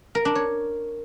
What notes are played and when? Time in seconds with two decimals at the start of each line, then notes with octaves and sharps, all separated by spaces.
0.15 A#4
0.25 D4
0.35 C#5